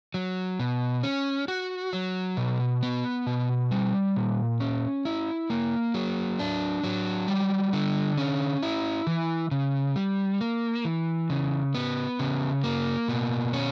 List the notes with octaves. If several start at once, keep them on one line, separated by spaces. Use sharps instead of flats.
F#3
B2
C#4
F#4
F#3
B2
B3
B2
G3
A#2
C#4
E4
A#3
F#3
D4
F#3
G3
D3
C#4
E4
E3
C#3
G3
A#3
E3
C#3
B3
C#3
A#3
B2
C#4